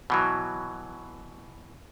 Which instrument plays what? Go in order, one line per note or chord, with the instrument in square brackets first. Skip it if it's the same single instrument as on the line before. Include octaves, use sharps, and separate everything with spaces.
[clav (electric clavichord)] B2 E3 F#3